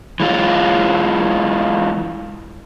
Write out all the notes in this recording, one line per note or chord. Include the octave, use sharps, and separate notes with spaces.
E3 G#3 F4